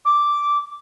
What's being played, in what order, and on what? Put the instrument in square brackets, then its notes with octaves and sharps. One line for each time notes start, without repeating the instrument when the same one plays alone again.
[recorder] D6